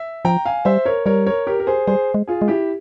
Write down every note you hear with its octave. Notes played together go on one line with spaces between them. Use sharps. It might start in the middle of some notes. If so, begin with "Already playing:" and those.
Already playing: E5
F3 G5 A#5
F5 G#5
G3 C5 E5
A#4 C#5
G3 A#4 C#5
A#4 C#5
G4 A#4
A#4
G#4 C5
G3 G#4 C5
G#3
F4 G#4
G#3
E4 G4